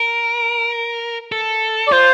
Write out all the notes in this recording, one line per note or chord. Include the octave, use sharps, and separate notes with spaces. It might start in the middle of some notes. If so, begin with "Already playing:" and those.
Already playing: A#4
A4
D5
F4 C5